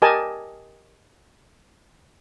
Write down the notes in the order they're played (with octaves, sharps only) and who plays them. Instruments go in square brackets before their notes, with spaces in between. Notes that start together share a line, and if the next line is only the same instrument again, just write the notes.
[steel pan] G4 A#4 D#5 G#5 A5